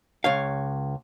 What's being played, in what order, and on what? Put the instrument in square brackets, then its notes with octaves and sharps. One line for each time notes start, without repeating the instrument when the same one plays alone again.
[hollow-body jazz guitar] C#2 C#5 F5